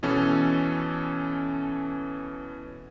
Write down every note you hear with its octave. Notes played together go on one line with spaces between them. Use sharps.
B2 E3 C#4 A4